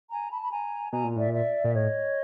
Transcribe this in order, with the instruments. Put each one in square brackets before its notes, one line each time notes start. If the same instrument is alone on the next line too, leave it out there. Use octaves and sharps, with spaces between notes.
[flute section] G#5 A#5
A5 B5
B5
G#5 A#5
[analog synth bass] B2 [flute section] G#5 A#5
[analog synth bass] A#2
[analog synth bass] A2 [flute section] D5 E5
[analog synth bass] A#2
[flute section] D5 E5
[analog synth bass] A#2 [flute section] E5
[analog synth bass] A2 [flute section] C#5 D#5